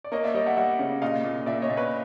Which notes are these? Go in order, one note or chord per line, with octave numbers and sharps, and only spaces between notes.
D5
A#3 C#5 D#5
D5 E5
G3 C#5 D#5
E5 F#5
G3 E5 F#5
C#3
A#2 D#5 F5
A#2
A#2 D5 E5
C#5 D#5
A#2
B4 C#5